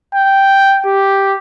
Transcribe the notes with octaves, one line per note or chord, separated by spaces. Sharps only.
G5
G4